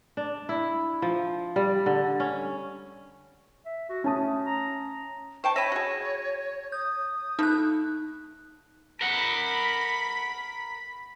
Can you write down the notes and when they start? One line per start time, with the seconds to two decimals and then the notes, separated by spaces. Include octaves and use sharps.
0.17 D4
0.49 E4
1.02 F3
1.56 G3
1.86 D3
2.20 C#4
3.66 E5
3.90 F#4
4.04 A3 C#4 A5 D#6
4.46 A#5
5.44 C5 G5 A5 C#6
5.56 C#5 E5 B5 A#6 D#7
5.72 F#4 G#4
6.72 D#6 G6
7.39 F3 A3 D#4 F#6
9.01 A#4 F#5 B5 B6